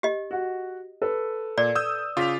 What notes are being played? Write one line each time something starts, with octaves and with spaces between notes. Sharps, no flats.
G4 D#5
F#4 F#5
A4 B4
A#2 D5
D#6 E6 G6
C#3 F4 D6 B6 F7